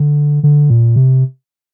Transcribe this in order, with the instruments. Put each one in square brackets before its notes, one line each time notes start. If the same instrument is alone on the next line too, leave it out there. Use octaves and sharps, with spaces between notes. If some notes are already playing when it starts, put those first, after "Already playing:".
Already playing: [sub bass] D3
D3
A#2
C3